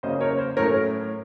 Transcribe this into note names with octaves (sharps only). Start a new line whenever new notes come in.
C#3 F#3 A#3 C#4 C5 D#5
A#4 C#5
C5
A2 F#3 A3 C#4 A#4 C#5